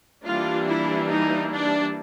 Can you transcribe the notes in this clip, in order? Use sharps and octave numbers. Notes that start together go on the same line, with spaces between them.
E3 G3 A#3 D4 F4
E4
D#4
D4